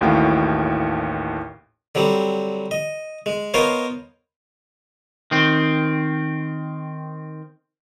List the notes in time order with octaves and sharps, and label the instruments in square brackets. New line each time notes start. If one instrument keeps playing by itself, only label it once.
[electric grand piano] A1 D#2 A2 F#4 F5 G5
[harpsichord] D3 F#3 G3 C4
D#5
G#3
B3 F4 A#4 C5 C#5 D#5
[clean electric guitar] D#3 C4